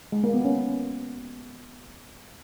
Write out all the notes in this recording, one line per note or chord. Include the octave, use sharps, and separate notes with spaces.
G#3
A#3
B3
C#4